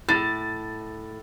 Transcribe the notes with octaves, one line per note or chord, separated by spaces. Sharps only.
A2 A6